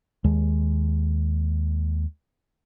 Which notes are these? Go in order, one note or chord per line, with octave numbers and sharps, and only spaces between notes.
D#2 G#3